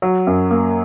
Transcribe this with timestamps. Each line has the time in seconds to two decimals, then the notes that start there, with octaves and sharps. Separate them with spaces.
0.02 F#3
0.27 F#2
0.51 A#3